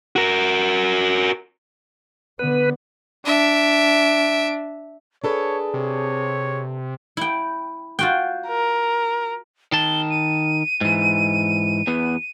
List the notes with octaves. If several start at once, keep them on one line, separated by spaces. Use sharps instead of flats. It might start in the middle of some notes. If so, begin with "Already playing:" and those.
F#4 A#4
D3 B3 B4
D4 E5 D7
D4 G#4 A4 B4 C#5
C3 C#5
E4 G5
F4 F#4 G5
A#4
D#3 A5 G7
D#7
G#2 E3
E2 B3